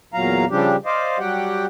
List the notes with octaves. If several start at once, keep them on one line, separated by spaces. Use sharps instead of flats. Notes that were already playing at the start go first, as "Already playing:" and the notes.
E2 A#2 F#3 F5 A#5
C#3 F3 G3 D4 G4
C5 D5 D#5 F5
F#3 G3 G4 F#5 G5